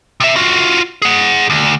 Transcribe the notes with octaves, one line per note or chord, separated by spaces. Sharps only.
C3 E5
F4 F#4
G#4 F#5
D2